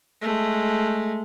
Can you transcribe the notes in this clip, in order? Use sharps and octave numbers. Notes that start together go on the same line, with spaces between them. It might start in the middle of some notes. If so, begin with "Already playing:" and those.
G#3 A3